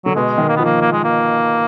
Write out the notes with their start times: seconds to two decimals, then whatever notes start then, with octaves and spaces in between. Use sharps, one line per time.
0.05 D3 F#3
0.16 B2 G#3
0.38 D#3
0.49 A#3
0.56 F3 B3
0.65 A#3
0.81 A#3
0.93 G#3
1.04 A#3